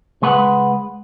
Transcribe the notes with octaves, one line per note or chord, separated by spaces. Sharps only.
C#2 G#3 B4 F#5